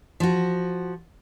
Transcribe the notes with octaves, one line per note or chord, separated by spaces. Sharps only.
F3 F#4